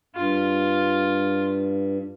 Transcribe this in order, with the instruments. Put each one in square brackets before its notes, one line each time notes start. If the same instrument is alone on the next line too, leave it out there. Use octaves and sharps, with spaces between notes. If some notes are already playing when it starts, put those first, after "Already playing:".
[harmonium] G2 [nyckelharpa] F4